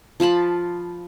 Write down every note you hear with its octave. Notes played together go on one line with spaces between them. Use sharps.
F3 F4 A5 B5